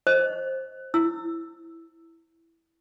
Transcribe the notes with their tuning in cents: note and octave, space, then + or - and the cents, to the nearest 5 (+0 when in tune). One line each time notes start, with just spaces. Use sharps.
C5 +10 D#5 +0
E4 +0 E6 +5